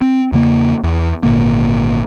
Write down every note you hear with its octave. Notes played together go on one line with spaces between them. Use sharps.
C4
E2 C#3 A#3
E2
G#1 A#2 D3 A#3